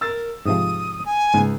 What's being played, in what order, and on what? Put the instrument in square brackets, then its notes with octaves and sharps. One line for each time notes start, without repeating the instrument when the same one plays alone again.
[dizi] A#4 [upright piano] E6 A6
[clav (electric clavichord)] G#2 C3 F3 [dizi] D#6
[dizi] G#5
[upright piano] C#2 [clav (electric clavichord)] G#2